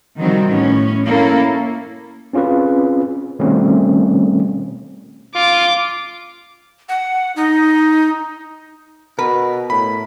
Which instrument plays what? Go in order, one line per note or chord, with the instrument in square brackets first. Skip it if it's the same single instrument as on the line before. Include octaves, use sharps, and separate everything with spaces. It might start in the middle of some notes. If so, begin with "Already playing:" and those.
[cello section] C3 D#3 F3 G3 C4 F#4
A2 B3 C#4
A#3 C#4 E4 A4
[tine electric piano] C4 C#4 F4 G#4 B4
B2 D#3 G3 A3 C4 C#4
[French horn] F4 [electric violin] D6
[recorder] F#5
D#4
[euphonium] B2 [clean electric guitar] A#4 [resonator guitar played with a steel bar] B4
[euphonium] A2 [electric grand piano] B5